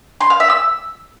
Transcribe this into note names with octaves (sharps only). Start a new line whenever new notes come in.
C6
F5
E5
E6